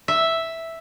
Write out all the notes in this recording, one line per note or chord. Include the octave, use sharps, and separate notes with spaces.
E5